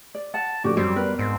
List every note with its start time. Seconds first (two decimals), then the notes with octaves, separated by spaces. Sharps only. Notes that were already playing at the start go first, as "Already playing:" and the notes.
0.15 D5
0.34 F#5 A5
0.64 A2 D3 F3 F#4 G4 D5
0.77 F#2 G3 C4 C#5
0.96 B3 A#4 B4
1.19 G#2 C4